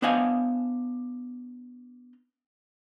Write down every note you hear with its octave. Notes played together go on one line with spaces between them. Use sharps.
B3 D4 C5 D#5 F5 G#5